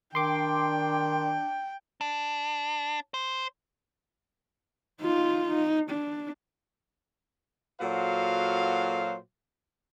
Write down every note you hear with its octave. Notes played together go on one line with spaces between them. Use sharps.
D#3 D4 G5 C6 D6
D4
C5
D#4 F4
D#4
D4
A#2 F#3 F#4 A4 C5 F5